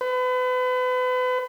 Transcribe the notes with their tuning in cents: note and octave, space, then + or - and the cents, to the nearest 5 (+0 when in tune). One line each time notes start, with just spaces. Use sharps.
B4 +35